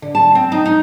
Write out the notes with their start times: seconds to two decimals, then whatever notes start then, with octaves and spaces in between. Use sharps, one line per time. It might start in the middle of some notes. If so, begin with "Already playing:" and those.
0.02 D3
0.15 A5
0.35 C4
0.52 D#4
0.66 D#4